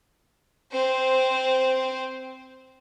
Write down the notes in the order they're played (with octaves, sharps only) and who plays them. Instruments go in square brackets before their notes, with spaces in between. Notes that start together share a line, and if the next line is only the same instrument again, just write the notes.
[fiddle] C4 C5